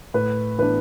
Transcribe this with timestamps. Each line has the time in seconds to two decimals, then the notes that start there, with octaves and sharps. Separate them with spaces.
0.14 A2 B4
0.58 E3 B3 D4 B4